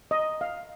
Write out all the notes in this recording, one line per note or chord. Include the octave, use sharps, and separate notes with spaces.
D#5
F5